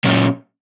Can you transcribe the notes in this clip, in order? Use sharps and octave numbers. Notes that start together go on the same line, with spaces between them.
A#2 F#3 C#4